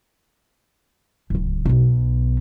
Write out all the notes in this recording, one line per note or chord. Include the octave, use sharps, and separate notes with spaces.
D1 C#2
B1 B2